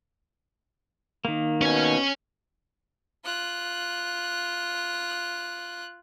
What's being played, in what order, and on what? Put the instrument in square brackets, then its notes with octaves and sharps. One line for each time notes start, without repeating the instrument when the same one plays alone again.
[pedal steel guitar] D#3 A#3
[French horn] B2 [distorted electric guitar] C#4 G#5
[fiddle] F4 F#6